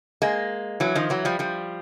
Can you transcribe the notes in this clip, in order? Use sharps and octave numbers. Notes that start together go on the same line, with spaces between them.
G#3 A#3
E3 F#3
D#3 F3
E3 F#3
F3 G3
F3 G3